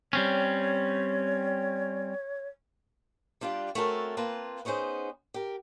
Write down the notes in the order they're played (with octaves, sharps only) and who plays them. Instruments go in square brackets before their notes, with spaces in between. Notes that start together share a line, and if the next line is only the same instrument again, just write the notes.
[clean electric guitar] G3 C4 C#4 [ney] C#5
[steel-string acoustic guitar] G3 D4 F4 G4 D5
A3 C4 C#4 F#4 A4 A#4
A#3 C4 F4 B4 A5
B3 C#4 D#4 G#4 C5
G4 A#4